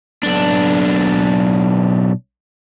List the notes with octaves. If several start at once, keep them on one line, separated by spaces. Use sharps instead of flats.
B1 D4